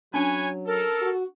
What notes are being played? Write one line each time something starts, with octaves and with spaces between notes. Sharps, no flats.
F#3 C#4 D4 B4 C#5 G#5
A4 A#4
F#4